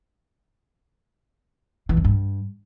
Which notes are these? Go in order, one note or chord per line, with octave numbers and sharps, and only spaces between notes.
E3
F#2
G2